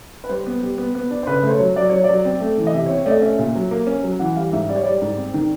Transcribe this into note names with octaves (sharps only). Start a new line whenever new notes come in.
B4
G3 C5
B3
G3
B3
B3
D4
C5
C#3 B4
A3 C5
C#5
F#3
F#3 D5
F#3 C#5
D5
F#3
C4
A3
E3
D#5
C3 E5
C#5
C4
C#5
A3 D5 D#5
C#4 E5
A#2
F#3
A#3
C#4
F#3
E3 F#5
G3 F5
G#2 E5
G3 D5
C#5
G3 D5
G#2
C4
D#3